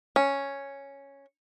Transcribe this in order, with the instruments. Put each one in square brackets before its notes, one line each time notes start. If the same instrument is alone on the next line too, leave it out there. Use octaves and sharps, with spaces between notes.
[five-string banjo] C#4